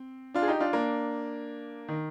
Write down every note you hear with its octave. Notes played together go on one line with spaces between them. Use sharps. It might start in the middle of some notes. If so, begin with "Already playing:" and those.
Already playing: C4
D4 F4
G#4
D#4 G4
D4 F4
A#3 D4
D#3